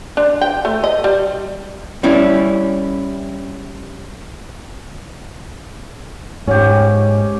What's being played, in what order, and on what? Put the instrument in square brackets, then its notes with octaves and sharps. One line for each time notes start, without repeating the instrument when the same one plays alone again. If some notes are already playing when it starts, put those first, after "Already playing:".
[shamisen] D4
G5
A3
D#5
G3
[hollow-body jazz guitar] G3 C#4 E4
[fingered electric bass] G#2 [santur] C#4 G4